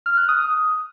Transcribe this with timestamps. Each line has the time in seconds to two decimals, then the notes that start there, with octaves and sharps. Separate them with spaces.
0.06 F6
0.17 F#6
0.29 D#6